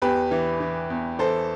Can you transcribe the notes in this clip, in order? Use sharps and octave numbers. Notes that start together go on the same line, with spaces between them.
E2 G4 B4
E3
E3
E2
E3 A4 C5